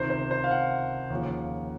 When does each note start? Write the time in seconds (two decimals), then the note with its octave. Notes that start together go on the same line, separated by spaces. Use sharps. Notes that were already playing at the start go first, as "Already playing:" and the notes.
Already playing: C#2 C3 D#3 C5
0.10 C5
0.31 C5
0.44 F5
0.51 F#5
1.10 D#2 C#3 F3